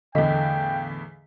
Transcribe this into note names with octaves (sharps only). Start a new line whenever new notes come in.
E2 A2 D3 D#5 F5 G5 B6